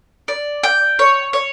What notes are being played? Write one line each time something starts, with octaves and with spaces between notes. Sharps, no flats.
D5
G5
C#5
C#5